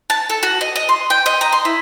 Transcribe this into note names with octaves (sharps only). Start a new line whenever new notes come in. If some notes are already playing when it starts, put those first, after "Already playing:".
A5
A4
F#4
D#5
D#5
C6
G5
D#5
A#5
C6
E4